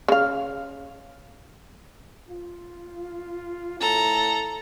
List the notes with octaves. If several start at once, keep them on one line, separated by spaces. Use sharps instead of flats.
C#3 F5
F4
A2 A4 A#5